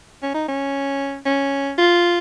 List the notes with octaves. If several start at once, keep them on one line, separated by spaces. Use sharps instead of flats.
C#4
D#4
C#4
C#4
F4